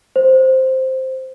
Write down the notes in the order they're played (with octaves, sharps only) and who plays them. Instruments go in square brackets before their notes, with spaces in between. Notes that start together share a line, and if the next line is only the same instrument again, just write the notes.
[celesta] C5